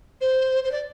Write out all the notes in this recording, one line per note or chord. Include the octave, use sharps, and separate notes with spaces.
C5
C5
D5